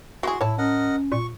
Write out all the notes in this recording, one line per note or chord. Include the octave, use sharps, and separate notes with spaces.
F#3 E4 F#4 G#4 C6
A2 E4 C#5 A5
C#4 A#4 D#5 F#5
A#2 C#6